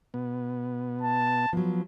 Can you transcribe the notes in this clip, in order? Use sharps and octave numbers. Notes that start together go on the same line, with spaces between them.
B2 B3
A5
F3 F#3 B3